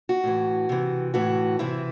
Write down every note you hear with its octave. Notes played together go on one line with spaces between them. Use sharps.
F#4
A2 E3
C3 E3
A2 E3 F#4
C3 E3 E4